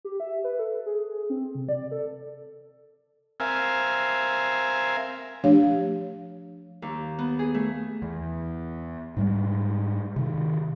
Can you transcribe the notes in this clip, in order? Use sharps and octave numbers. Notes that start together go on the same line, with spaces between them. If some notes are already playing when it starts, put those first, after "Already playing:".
G4
E5
B4
A4
G#4
C4
C3
D5
A4
C4 A#4 E5 F5 G#5
F3 A3 D4 G4 C#5 F5
D#2
B3
G#4
A3
E2
G#2 G3 G#3
C3 D#3